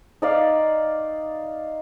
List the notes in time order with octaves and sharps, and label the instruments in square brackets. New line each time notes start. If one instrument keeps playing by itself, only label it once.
[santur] D#4 D5 F5